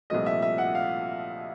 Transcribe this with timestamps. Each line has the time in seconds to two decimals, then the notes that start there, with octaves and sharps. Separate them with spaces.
0.10 C2 A#2 F3 A3 D#5
0.26 E5
0.42 E5
0.58 F#5
0.75 F5